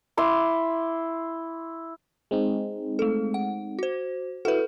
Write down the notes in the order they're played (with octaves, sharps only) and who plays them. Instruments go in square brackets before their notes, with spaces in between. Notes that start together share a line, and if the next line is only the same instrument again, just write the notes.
[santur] E4 C6 D6
[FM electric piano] G#3 C4 D#4
[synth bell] A3 A4
F#5
F#4 C5
[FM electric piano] E4 F#4 [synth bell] A4 B4